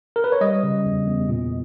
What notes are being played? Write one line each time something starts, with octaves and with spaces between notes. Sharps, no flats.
A#4
B4
C#5
G3 D#5
C#3
E2
E2
A#2